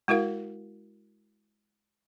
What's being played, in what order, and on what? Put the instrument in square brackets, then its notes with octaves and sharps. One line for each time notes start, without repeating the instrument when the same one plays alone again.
[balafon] G#3 E4 F#4 A#4 F5